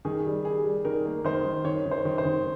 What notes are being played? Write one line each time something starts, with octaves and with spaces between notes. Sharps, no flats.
D#3 G#4
G3
G3 G#4
G3
D#3 A#4
A#3
D#3 C5
D#3
D#3 C#5
D#3
C5
D#3
C5
D#3